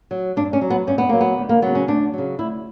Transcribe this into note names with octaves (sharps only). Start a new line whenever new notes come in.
F#3
G2 D4
C#4
F#3
B3
G2 C#4
B3
F#3 A#3
B3
D2
A#3
C#3 F#3 B3
C#4
D2 D4
C#3 F#3
D2 E4